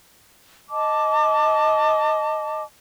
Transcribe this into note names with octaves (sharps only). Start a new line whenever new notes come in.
D#5 A5 D6